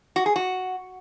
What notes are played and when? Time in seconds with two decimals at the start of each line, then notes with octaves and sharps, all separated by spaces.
0.16 F#4
0.26 G#4
0.36 F#4